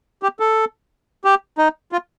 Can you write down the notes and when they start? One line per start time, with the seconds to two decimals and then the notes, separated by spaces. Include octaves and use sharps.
0.23 G4
0.40 A4
1.25 G4
1.58 D#4
1.92 F4